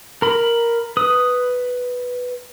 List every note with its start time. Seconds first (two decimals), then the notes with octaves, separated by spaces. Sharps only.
0.22 A#4 B5
0.97 B4 D#6